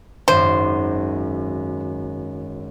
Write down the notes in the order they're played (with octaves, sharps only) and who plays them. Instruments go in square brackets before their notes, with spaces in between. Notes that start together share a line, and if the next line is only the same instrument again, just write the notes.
[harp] G#1 F#2 [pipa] C5